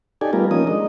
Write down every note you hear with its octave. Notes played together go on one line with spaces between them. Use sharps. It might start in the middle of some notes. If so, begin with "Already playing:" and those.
D#4 G4 A4 D5 G#5
G3 A3 B3 F4 A#4
F3 A#3 C#4 D#4 A#4 D#6
G#3 D4 D#5